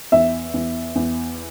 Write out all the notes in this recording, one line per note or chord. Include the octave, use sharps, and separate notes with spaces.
E2 E5
E2
E2